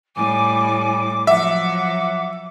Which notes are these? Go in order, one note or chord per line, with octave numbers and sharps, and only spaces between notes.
A2 G3 G#5 D6
F3 F#3 E5 F#5 D6